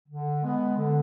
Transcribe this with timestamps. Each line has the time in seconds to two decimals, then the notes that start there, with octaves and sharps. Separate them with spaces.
0.09 D3
0.42 G#3 B3
0.76 D3